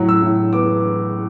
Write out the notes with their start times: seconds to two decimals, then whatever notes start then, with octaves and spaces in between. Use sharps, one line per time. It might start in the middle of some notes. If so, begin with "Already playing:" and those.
Already playing: A2 F#3
0.09 E6
0.22 A2
0.53 B3 D6